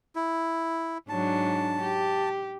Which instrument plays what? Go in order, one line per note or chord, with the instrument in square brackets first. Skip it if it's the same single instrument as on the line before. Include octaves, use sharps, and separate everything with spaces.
[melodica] E4
[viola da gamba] G#2 F#3 D4 [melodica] A5
[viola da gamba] G4